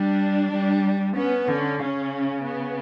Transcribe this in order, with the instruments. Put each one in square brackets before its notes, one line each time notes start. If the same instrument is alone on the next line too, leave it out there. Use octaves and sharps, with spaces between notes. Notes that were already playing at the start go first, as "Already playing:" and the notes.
Already playing: [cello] G3 [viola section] D4
[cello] G3
[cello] B3 [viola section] C#4
[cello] D3 [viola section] C#4
[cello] C#3 [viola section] C#4
[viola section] B3